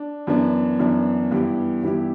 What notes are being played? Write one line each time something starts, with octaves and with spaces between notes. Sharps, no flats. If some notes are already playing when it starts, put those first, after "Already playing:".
Already playing: D4
F#2 E3 B3 D4
F#2 E3 B3 D4
G2 E3 B3 E4 G4
G2 E3 B3 E4 G4